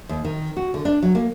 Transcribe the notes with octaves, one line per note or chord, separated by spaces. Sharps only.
D#2
D#3
F#4
D3
D4
F#3
A#3